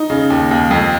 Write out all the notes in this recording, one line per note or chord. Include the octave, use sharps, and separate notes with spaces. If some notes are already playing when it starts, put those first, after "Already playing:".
Already playing: D#4
C#3
D#2
D#2
F2